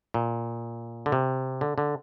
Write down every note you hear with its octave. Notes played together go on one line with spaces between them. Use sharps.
A#2
D3
C3
D3
D3